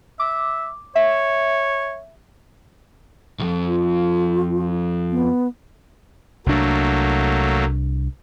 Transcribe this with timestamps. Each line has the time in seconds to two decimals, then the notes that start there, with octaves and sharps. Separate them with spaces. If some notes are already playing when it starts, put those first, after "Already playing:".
0.20 E5 D6
0.96 C#5 E5
3.39 C2 F2
3.67 F4
5.12 B3
6.46 C2 F#3 A3 A#3 D4